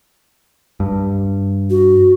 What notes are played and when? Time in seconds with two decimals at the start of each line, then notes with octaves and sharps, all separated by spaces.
0.80 G2
1.70 F#4